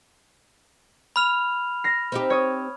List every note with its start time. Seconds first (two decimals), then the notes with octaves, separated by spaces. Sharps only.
1.16 B5 F6 F7
1.84 A#6 C7
2.12 C4 D#4 G4
2.30 C#5 D#6